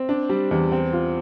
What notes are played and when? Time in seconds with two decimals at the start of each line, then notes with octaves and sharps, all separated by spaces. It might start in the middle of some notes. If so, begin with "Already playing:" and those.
Already playing: C4
0.09 D4
0.29 G3
0.51 E2
0.72 C4
0.93 F4